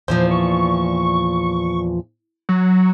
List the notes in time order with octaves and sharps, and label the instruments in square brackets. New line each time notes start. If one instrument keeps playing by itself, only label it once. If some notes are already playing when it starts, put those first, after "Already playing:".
[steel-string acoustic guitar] E2 A#2 F3 [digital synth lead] C5
[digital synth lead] C#6
F#3